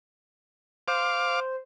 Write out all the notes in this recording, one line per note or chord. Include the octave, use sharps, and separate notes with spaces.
C5 F5 D6